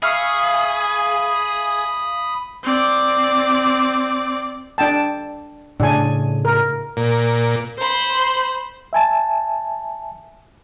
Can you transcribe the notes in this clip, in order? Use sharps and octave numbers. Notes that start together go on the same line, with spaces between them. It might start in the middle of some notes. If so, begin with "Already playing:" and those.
G#4 E5 F5 B5 C#6 D#6
C4 D5
D4 G5 A5
A2 C#3 A3 D4 G#5
A#4
A#2
C5 B5 C6
E5 G#5 A5